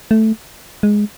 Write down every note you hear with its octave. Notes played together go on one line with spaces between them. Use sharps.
A3
G#3